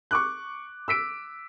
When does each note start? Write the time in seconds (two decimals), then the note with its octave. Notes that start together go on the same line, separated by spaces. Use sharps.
0.11 C#6 D6 F#6
0.88 E6 B6 D7